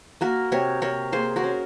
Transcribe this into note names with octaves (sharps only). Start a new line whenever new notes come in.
A#3 F#4 A#4
C3 A#4 C#5
C3 A#4 C#5
A#3 G#4 C5
F#4 A#4
C#4